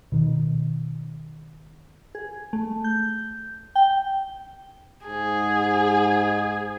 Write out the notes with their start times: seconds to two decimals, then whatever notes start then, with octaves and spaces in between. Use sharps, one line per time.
0.12 B2 D#3
2.15 G#4
2.53 A3
2.84 G6
3.75 G5
5.06 G#2 G#4